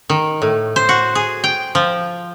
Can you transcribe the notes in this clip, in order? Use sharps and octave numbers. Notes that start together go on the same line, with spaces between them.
D#3
A2
C5
F#4
G#4
G5
F3